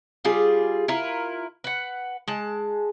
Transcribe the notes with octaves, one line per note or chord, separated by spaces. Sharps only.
G3 F4 G#4
E4 F4 A#4
B4 F#5
G#3 A5